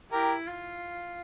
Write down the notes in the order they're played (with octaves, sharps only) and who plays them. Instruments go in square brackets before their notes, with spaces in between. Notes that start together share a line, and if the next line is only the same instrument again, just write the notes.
[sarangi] E4 [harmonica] G4 A#4
[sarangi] F4